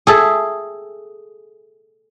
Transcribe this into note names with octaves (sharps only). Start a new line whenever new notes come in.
G#4 A4 E5